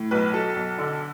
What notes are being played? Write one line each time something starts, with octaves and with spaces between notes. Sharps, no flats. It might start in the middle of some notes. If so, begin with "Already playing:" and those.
Already playing: A2
B1 B4
F#3 A4
B1
D3